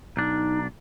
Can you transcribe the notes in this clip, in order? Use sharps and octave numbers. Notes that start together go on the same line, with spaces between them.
B1 D4 D#4